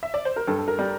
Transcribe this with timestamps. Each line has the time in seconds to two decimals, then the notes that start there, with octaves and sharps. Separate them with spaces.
0.03 E5
0.14 D5
0.25 C5
0.36 A#4
0.47 G2 A4
0.59 A4
0.68 A#4
0.79 G3